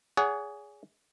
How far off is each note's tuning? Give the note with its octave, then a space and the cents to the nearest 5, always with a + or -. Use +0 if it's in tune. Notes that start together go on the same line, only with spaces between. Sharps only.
G#4 +0 C#5 +45 F#5 +0